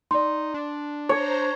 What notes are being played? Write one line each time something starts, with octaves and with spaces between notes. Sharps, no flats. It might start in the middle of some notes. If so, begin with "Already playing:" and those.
D#4 D5 C6
D4
C5 C#5 A#5